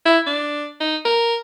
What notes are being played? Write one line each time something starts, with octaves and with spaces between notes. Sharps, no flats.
E4
D4
D#4
A#4